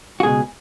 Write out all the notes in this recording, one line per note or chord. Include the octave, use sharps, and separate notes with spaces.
F#4
C#2 B2 G#3 G#4